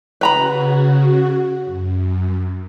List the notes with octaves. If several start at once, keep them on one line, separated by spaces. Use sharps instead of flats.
C#3 F#4 B4 A#5 B5
F#2